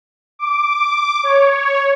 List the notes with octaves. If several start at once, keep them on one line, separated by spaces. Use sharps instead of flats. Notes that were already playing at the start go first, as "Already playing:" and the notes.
D6
C#5